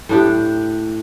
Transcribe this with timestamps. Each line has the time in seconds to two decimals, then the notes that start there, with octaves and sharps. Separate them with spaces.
0.09 A2 D4 G4